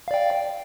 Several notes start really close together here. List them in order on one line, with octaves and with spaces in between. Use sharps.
F5 D5 G5